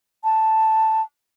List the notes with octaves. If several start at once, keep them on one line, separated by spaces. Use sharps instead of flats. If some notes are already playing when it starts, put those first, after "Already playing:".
A5